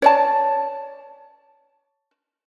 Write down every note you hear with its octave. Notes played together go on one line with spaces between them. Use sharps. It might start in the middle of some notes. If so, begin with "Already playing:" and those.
C#5 D5 A5